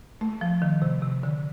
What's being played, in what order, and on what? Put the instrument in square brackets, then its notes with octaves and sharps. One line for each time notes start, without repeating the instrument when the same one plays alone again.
[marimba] A3
F3
D#3
C3
C3
D3